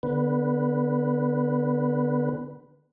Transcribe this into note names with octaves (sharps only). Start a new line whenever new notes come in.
D3 B3 B4